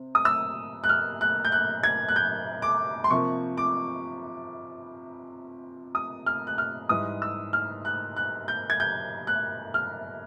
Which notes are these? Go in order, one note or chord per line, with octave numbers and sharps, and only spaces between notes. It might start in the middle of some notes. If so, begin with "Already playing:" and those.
Already playing: C3 C4
D#6
E6
F#6
F6
F#6
G6
F#6
G#6
F#6
G6
D6
C6
C3 F3 A#3 C#6
D6
D#6
F6
F#6
F6
G#2 E3 G3 D#6
E6
F6
F#6
F#6
G6
G#6
G6
F#6
F6